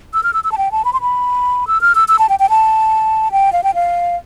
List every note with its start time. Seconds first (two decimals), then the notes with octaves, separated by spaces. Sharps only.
0.14 E6
0.23 F6
0.33 E6
0.44 E6
0.52 A5
0.58 G5
0.72 A5
0.85 B5
0.93 C6
1.01 B5
1.67 E6
1.81 F6
1.95 E6
2.08 E6
2.19 A5
2.29 G5
2.40 G5
2.50 A5
3.32 G5
3.53 F5
3.64 G5
3.75 F5